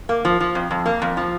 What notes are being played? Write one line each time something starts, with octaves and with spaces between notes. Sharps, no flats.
A#3
F3
F3
F2
F2
A#3
F2
F3